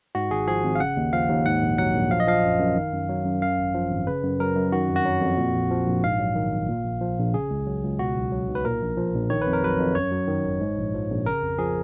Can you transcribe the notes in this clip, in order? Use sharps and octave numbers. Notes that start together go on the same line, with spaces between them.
G#2 F#4
G#1 G#4
F3 G#4
G#1
F5
C#3 F#5
D#2
F3 F5
D#2
G#2 F#5
A#1
F#3 F#5
A#1
F3 F5
D#5
F3 F5
F#2
F#2
D#3
F#2
F#3
F#2
F#2 F5
G#1
F3
G#1
C#3 B4
F#2
F#3 A#4
F#2
D#3 F#4
F2
F#4
F#3
F2
A#2
A#1
F3
A#1
G#2 F5
F#3
D#3
G#1
A#2
A#1
F3
A#1
C#3 G#4
C#2
F#3
C#2
B2 F#4
B1
F#3
B1
B4
A#2 A#4
A#1
F3
A#1
D#3 C#5
F2 B4
A#4
F#3 B4
F2
F#2 C#5
F#3
D#3
G#1
G#2
A#1
F3
A#1
C#3 A#4
F2
F3 G#4